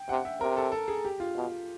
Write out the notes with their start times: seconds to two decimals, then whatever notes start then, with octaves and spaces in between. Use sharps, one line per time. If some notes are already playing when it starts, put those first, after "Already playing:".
Already playing: G5
0.09 C3 F#5
0.25 E5
0.41 C3 A#4
0.57 A4
0.72 A4
0.88 G#4
1.05 G4
1.20 F4
1.36 B2